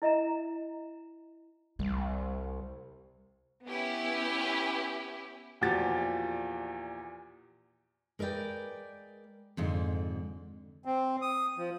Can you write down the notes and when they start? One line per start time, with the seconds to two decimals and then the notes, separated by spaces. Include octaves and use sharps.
0.02 E4 D#5 E5 A#5
1.79 C2 G3
3.65 B3 C#4 E4 G4
5.61 E2 A#2 F3 F#4 G4 A6
8.19 G#3 A#4 B4 D5 G5
9.57 F2 G#2 D3
10.85 C4
11.22 D#6
11.57 F3